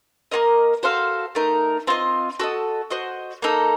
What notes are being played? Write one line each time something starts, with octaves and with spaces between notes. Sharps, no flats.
A#3 F4 A#4 D#5
F#4 A4 C5 F5
A3 D#4 A#4
C4 F4 C5 D#5
F#4 A4 D#5
F#4 C5 D#5
A#3 D#4 A4